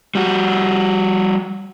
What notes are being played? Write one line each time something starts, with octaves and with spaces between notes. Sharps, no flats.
G3 F#4